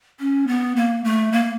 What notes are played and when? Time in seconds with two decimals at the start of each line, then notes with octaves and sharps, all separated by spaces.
0.20 C#4
0.47 B3
0.76 A#3
1.04 A3
1.32 A#3